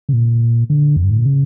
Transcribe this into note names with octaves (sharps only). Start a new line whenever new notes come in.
C#3
A#2
D3
F2
G2
A2
A#2
C#3